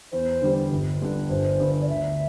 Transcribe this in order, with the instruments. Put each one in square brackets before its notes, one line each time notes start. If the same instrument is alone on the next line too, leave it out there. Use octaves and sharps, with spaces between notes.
[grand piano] E2 [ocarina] C5
[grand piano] D3 G3
G1
G2 D3 G3 D4
[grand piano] G1 [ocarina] C5
[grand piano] G2 D3
[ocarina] D5
[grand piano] D2 [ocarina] E5